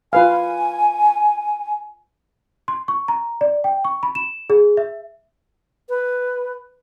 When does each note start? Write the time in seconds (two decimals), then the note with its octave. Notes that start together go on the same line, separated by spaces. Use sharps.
0.13 F4 B4 F5 G#5
2.68 C6
2.88 C#6
3.08 A#5
3.41 D5
3.64 G5
3.85 C#6
4.03 B5
4.15 E7
4.50 G#4
4.77 E5
5.89 B4